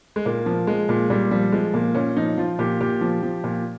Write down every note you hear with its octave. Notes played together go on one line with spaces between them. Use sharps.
G#3
A#2 A#3
F3
F3 G#3
A#2
A#2 G3
F3 G3
F3 G#3
A#2 A#3
A#2 C#4
F3 D#4
F3 F4
A#2 G4
A#2 G4
F3
F3
A#2